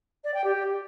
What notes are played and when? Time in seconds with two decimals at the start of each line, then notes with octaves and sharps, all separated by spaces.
0.24 D5
0.34 G5
0.44 G4